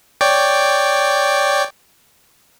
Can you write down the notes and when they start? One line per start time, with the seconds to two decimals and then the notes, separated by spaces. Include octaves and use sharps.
0.21 C#5 D5 G5